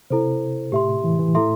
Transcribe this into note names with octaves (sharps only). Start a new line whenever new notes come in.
C3 E4 A4 C5
A2 G4 E5 C6
E3
E3
A2 E4 A4 E5 C6